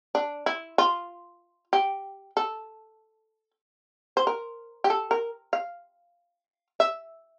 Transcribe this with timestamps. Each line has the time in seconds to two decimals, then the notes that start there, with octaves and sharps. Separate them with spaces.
0.15 D4
0.46 E4
0.78 F4
1.73 G4
2.37 A4
4.17 C5
4.27 A#4
4.84 G4
4.90 A4
5.11 A#4
5.53 F5
6.80 E5